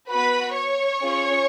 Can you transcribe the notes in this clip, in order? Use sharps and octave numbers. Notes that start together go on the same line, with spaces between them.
B3 F#4 B4 B5
C#5 C#6
C#4 F4 G#4